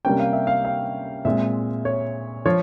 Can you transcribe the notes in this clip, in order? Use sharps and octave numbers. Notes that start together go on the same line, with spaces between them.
C3 G3 A#3 C#4 G5
F5
E5
F5
F5
A#2 G#3 C4 E5
C#5
F3 C#5